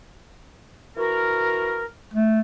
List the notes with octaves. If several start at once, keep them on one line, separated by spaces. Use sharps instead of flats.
E3 F#4 A#4
A3